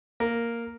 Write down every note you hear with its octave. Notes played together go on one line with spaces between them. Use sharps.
A#3